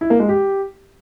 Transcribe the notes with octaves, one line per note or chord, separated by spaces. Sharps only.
E4
A#3
G#3
G4